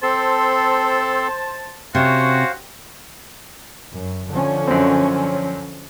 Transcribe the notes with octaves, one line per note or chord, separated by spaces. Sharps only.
C4 A4 C5 A5 C6
C3 C4 C#4 F#4 C5 F5
F#2
D3 F3 C#4
F#2 C4